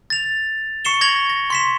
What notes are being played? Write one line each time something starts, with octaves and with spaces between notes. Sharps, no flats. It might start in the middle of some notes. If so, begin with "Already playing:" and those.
A6 F7
C#6 C7 C#7 E7 G7
C#6 G#6 A#6 F7 F#7
A#6
C6 B6 E7